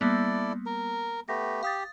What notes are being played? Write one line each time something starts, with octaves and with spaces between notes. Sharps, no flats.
G3 A#3 B3 E4 A4 D5
A#4
A3 B3 G4 A#6
G4 F5 D#6 A6